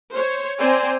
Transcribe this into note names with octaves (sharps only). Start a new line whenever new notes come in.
C5 C#5
C4 C5 D5 G#5 A#5